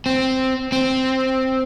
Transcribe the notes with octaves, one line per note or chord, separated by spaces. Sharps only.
C4
C4